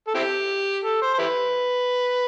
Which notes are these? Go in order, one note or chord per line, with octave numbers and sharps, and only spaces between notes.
A4
C4 E4 G4
A4
C5
C5
E4 G4 B4